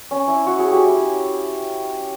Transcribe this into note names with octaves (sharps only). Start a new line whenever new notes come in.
C#4
E4
F#4
G#4
G4
E4